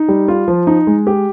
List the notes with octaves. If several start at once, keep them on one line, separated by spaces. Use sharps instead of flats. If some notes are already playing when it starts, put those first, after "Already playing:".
Already playing: D#4
G3
F4
F3
D#4
G#3
G4